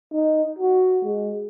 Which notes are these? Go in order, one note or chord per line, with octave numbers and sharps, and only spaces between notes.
D#4
F#4
G#3